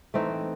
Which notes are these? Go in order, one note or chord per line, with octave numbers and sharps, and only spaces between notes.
E3 A3 C4 D#4